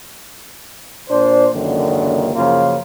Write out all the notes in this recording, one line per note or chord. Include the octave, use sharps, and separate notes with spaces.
A#2 D4 C5
C#2 F#2 D3 D#3 A#3
F#2 C#3 F3 A#3 F4